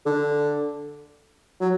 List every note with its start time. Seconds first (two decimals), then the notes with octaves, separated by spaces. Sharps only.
0.06 D3
1.61 F#3